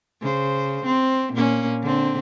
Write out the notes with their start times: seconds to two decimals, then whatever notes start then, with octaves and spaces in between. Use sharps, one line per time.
0.21 C#3 C5
0.85 C4
1.33 A#2 A#3 C#4
1.82 D3 C4